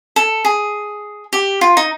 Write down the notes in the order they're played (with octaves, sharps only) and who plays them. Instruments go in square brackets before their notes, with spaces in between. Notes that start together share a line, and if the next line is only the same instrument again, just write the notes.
[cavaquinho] A4
G#4
G4
F4
D#4